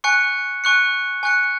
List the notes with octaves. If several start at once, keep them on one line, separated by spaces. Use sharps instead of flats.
G#5 C#6 F#6 C#7
G#5 C#6 F#6 C#7
G#5 C#6 F#6 C#7